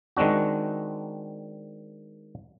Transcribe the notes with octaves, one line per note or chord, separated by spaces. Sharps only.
D#3 G#3 C4 D4 F#4